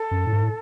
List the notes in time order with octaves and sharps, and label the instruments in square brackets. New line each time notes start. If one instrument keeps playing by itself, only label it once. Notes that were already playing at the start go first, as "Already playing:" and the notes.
Already playing: [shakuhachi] A4
[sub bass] F#2
A2
G#2
A2